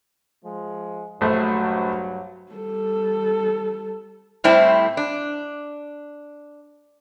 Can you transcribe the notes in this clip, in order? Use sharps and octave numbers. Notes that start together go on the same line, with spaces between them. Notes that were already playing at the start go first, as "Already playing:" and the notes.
F3 G#3
A#1 G2 F#3 A3 C5
G3 A4
A2 G3 C4 E4 C5 A5
D4